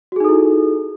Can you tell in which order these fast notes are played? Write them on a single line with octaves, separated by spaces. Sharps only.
F#4 G#4 D#4 A4 E4